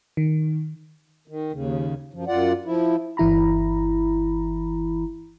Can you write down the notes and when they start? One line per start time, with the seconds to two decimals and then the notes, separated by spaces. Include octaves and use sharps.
0.17 D#3
1.28 D#3
1.53 D#2 C#3
2.13 F#2 F3
2.27 F#2 F4 D5 F#5
2.65 F3 E4
3.17 G1 E3 E4 A#5 B5